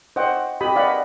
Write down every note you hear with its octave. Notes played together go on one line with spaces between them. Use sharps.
C5 D#5 F#5 G5
G4 D#5 B5 D#6
D5 D#5 F5 F#5 B5